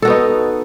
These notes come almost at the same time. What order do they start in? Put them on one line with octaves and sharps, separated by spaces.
A4 F#4 B3 D#4